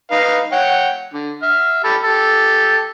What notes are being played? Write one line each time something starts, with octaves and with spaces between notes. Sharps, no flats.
D#4 B4 F5
C#5 F#5 G5
D3
E5 F6
G4 A4 B5
G4 A4